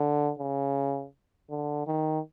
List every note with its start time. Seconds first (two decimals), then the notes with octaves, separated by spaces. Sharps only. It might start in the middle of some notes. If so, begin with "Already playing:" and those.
Already playing: D3
0.39 C#3
1.50 D3
1.87 D#3